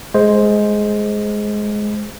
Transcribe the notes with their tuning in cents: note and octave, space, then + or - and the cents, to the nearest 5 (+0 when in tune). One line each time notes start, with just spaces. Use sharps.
G#3 +10 C5 +0